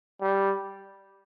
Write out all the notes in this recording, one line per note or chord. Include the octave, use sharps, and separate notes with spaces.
G3